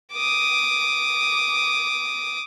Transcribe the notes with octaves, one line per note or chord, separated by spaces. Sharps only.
D6 D#6